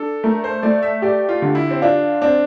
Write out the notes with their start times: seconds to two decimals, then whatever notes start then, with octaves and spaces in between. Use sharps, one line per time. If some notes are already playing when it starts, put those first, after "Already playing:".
Already playing: D4 A4
0.24 A3 A#4
0.44 C5
0.63 A3 D5
0.83 E5
1.02 G4 D5
1.29 F4
1.42 D3
1.55 E4
1.71 C4
1.82 D4 F4
2.22 C4 D4